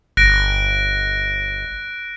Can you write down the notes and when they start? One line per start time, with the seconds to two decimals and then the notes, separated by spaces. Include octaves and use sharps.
0.17 G1 F#6 A#6 D7